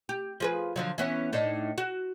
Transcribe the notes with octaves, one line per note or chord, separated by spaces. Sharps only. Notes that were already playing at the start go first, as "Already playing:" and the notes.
G4
F3 G#4 B4
D3 F3 F#3
E3 B3 C#4
A2 D4 D#4
F#4